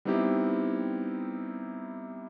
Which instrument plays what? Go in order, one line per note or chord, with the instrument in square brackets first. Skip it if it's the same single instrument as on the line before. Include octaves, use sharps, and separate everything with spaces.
[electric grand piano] G3 B3 C4 D#4 E4 G4